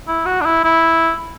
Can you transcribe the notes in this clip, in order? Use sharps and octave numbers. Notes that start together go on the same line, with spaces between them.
E4
F#4
D4
E4
E4